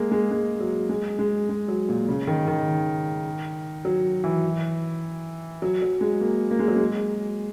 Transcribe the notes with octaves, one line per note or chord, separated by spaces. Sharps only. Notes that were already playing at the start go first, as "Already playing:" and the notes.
Already playing: G#3 A#3
G#3
G#3
F#3
G#3
G#3
G#3
F#3
A#2
C#3
D#3
D#3
F#3
E3
F#3
F#3
G#3
A#3
A#3
G#3
F#3
G#3